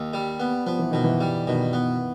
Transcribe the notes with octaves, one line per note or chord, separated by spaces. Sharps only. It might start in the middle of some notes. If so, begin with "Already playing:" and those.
Already playing: D#2
G3
B3
F3 B3
E3
B2 D#3
E3
G3
B2 D#3
B3